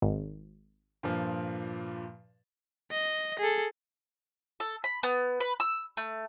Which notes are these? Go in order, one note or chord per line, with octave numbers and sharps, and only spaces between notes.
G#1
G2 A#2 F3
D#5
G#4 A4
A4
B5
B3
B4
E6
A3